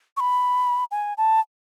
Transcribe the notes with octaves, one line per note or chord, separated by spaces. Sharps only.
C#6
B5
G#5
A5